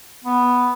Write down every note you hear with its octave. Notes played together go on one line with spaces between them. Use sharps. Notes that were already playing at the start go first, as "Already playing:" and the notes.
B3